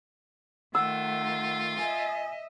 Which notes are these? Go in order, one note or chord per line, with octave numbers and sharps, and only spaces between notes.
D#3 A3 F4 F#5 E6
D#5 E5 G#5